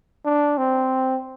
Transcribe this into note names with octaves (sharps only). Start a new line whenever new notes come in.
D4
C4